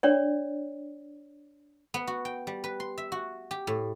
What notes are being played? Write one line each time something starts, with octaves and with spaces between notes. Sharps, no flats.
D4 C#5 D5
B3
F#4
G5
G3
B4
C6
E5
F#4
G4
A2